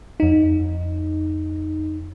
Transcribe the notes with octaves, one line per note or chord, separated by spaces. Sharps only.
F2 D#4